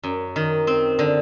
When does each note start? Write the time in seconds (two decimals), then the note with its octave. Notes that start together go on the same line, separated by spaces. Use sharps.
0.03 F#2
0.36 D#3
0.67 C4
0.99 D3